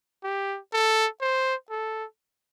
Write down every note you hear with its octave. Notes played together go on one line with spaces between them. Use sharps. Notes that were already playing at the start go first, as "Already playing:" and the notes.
G4
A4
C5
A4